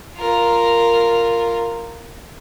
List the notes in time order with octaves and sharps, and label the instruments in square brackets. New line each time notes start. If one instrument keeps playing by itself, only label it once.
[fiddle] F4 A#4